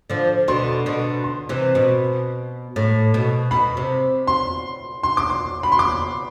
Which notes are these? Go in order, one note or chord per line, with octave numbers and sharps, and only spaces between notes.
D3 F3
B2 D3 C6
B2 D3
C6
C3 E3
B2
A2
B2
B2 B5
C3
C6
C6
D6
C6
B5
C6
D6